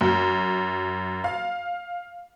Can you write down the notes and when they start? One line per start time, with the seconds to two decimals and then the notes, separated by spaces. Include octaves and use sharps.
0.01 F#2
1.24 F5